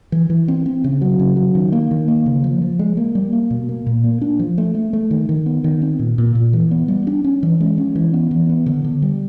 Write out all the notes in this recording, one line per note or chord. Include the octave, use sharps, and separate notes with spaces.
E3
E3
C4
C4
C#3
F#3
C#3
F#3
D#3
A#3
D#3
A#3
C#3
F3
F3
G#3
A#3
G3
A#3
B2
A#3
A#2
A#3
D4
F3
A3
A3
A3
D#3
D#3
B3
D#3
C4
A#2
A#2
A#2
E3
B3
G3
D4
C#4
E3
G#3
C#4
E3
B3
E3
B3
D3
D3
G3